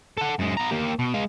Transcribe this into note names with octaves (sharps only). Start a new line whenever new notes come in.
A4 F#5
F#2 G#3
B3 A#5
A#3 G4
B2
G#3 F5